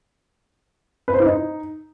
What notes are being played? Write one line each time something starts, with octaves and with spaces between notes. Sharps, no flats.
B4
C5
E4
D#4